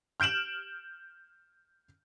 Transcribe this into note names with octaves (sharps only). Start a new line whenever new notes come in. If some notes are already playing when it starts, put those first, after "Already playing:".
F6 G6 D7 E7 F#7